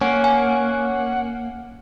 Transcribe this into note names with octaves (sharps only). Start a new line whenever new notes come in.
A#3 C#4 F#5
G#5